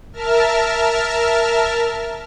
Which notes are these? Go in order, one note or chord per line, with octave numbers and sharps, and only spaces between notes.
A#4 E5 A5 F6